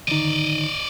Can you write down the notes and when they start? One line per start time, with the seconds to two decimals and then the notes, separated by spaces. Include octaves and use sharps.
0.08 D3 D#3 D#4 D5 D#5